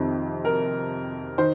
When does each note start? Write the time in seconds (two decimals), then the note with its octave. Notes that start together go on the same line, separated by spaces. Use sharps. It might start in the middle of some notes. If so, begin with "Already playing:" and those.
Already playing: F2 C3 D#3
0.45 A#4
1.38 D#3 C5